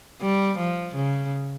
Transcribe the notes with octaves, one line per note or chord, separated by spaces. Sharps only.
G3
F3
C#3